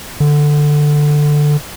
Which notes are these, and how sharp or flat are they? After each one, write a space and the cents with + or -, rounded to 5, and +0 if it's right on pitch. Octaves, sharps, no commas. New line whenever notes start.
D3 +10